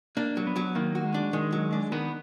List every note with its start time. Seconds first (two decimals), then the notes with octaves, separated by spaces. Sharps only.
0.17 A#3 D4
0.37 F#3
0.47 B3
0.56 F#3
0.75 D#3 A#3
0.95 F#4
1.04 G#3
1.14 D4
1.33 D#3 G#3
1.53 F#3
1.73 D4
1.92 D#3 B3